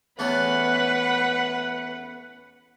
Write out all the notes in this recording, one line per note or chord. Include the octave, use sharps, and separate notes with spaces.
E2 A3 C#4 B4 F#5